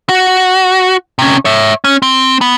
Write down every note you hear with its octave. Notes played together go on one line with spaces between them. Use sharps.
F#4
C3 C#4
C#5 E5
C#4
C4
B3